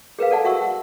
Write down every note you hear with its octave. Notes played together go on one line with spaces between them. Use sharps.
G#4 A#4 B4 F5
A4 D5 F#5 A5
F#4 E5 F#5 C#6 E6
F#5